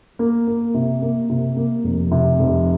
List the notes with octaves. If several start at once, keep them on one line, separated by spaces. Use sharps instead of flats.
A#3
A#3
C3
A#3
C3
A#3
F1
C3
F1